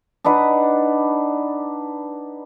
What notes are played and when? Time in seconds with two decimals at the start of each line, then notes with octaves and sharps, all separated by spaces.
0.24 D4 D#4 B4 F#5